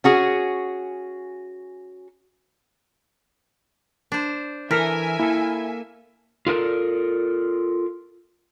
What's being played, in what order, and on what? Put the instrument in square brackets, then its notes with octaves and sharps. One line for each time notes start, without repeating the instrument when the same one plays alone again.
[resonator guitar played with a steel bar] C#4 F#4 G#4
[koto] D4 C5
[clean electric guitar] E3 A4 [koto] A#4 [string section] E5 G#5 [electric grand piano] F6 B6 D7
[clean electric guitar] A#3 A4 [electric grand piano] E4
[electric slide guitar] F4 A4 A#4